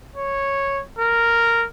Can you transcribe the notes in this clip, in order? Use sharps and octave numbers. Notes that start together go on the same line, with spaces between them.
C#5
A#4